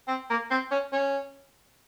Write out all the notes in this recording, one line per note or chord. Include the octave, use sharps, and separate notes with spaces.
C4
A#3
C4
C#4
C#4